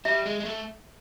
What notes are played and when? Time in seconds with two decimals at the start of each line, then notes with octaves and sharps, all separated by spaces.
0.05 G3 E5
0.26 G#3
0.40 G#3
0.45 A3